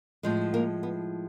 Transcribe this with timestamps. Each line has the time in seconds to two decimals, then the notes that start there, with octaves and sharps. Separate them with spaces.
0.23 A2 F3 G#3
0.54 A#3 A#4
0.83 B3